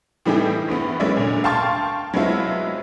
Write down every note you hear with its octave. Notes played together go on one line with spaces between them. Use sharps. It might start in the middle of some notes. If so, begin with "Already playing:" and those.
A2 E3 G3 D#4 G4 G#4
G2 E3 B3
F#3 G#3 A#3 C#4 D5 E5
A#2 D3
F5 G5 A5 C6 C#6 A6
F#3 G#3 B3 C4 E4 F4